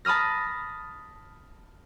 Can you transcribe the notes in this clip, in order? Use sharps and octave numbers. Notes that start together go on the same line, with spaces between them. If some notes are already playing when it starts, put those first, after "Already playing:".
A5 B5 D#6 F6 A#6